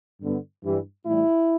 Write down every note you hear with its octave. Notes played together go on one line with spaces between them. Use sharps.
G2 D3 B3
G2 E3 G3
A2 E3 G3 E4